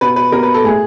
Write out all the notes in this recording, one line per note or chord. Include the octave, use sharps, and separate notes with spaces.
B2 B4
B4
B2 A#4
B4
A4
A2 G#4